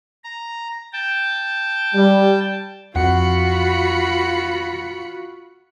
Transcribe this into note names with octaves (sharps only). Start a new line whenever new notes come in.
A#5
G5 A5
G3
F2 F3 F4 F#4 F#5 B5 C#7